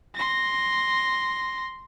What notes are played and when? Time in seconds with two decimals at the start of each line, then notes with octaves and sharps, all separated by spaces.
0.15 C6 A#6